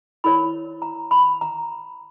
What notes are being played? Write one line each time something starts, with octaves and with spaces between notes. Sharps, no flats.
E4 A#4 C#5 B5
A#5
B5
A#5